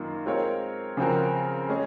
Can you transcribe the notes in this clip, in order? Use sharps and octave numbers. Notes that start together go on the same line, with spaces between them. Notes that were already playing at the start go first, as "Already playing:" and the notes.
Already playing: F#2 D#3 A#3 F4
G#3 C4 F4 A#4 C#5
C#3 F3 C4 F#4 A#4
G#3 C#4 G#4